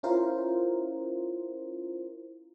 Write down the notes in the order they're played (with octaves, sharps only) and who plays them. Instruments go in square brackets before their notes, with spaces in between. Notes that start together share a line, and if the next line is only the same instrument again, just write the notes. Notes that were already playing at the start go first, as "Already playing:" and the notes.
[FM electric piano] C#4 E4 F4 A#4 C5